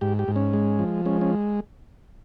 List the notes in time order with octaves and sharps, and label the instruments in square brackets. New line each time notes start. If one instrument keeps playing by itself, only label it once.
[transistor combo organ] G#2 G4
G4
G#2
C#4
G#3
F3
G#3 C#4
C#4